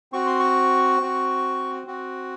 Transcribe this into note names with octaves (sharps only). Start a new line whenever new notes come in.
C4 F#4 C#6
C6
C#6
C4 F#4
C4 F#4